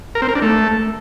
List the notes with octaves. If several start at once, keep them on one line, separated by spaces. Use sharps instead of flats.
A#4
C4
A#4
D4
A3